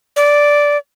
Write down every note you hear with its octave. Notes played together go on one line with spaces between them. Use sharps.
D5